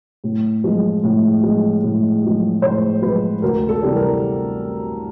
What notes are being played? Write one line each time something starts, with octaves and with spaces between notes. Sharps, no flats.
A2
F3 G#3
A2
F3 G#3
A2
F3 G#3
A2 C5
F3 G#3 B4
D2 A#4
A4
C3 E3 G3
A#4